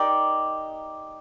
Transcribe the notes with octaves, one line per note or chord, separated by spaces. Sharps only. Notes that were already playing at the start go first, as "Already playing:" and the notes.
Already playing: D#4 G4 A#4 D5